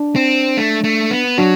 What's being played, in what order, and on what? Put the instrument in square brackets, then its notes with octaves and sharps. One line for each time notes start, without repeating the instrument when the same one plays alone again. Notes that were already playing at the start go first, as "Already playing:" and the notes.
Already playing: [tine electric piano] D4
[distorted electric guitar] C4
A3
A3
B3
[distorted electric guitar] F#3 [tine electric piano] D4 F#4